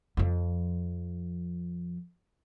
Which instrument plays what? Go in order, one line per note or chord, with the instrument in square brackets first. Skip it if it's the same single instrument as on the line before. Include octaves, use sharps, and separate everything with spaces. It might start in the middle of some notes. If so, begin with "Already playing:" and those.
[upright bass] F2 F3